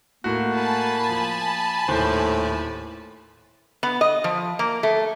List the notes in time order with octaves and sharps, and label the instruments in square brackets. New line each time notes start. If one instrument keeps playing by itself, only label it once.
[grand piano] A2 F#4 [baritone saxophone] A#3
[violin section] G#5 A5 B5
[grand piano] F3
[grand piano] D#1 C5 [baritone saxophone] A2
[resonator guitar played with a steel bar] B3
D#5
F3
A#3
A3